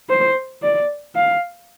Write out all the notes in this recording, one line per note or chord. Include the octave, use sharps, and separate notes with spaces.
C5
D5
F5